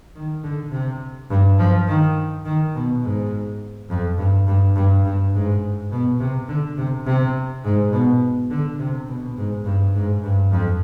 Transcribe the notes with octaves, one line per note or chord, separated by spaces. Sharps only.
D#3
D3
C3
G2
F3
D#3
D#3
B2
G#2
F2
G2
G2
G2
G2
G#2
B2
C3
D3
C3
C3
G#2
B2
D3
C3
B2
G#2
G2
G#2
G2
F2